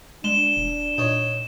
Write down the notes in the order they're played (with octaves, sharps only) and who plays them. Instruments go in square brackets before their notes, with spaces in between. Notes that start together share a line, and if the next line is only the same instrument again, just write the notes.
[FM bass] G#3 [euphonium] D4 [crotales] E7 G7
[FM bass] E1
[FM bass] A#2 [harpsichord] D#4 C#5